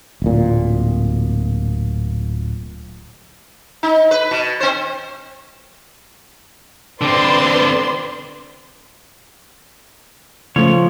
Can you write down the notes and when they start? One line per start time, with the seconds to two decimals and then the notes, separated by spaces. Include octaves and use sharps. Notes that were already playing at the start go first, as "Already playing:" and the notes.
0.22 D1 A#2
3.83 D#4
4.11 B4
4.31 B2
4.60 C4 C5
7.01 D3 C4 B4 D5 C6
10.56 C#3 F3 A3 C#5